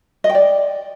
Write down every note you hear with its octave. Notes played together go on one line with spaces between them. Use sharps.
D#5
G5
D5